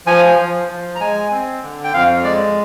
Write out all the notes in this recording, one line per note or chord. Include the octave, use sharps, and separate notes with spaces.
F3 G#5
F3
F3
A#5
G#3 G#5
C4
D3
G5
F2 F5
G#3 D5